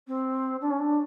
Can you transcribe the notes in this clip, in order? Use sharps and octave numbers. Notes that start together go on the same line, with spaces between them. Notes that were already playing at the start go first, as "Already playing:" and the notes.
C4
D4
C#4
D4